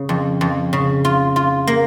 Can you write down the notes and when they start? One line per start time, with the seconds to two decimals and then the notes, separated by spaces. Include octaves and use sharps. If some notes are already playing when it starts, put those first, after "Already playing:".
Already playing: C#3
0.09 F2
0.41 F2
0.73 C#3
1.05 F4
1.36 F4
1.67 A#3